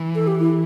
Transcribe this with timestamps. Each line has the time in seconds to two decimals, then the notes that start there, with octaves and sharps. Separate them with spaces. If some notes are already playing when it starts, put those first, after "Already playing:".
Already playing: E3
0.15 A4
0.27 G4
0.39 E4